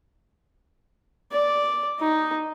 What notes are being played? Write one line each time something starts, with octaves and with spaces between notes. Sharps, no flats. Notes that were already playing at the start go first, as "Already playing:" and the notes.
D5
D#4